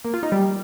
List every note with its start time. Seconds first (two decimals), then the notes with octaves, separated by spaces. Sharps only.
0.05 A#3
0.14 F4
0.23 D#4
0.32 G3